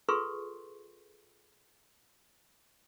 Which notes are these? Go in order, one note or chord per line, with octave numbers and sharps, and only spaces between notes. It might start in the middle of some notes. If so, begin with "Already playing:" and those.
F4 G#4 A4 B4 C6 C#6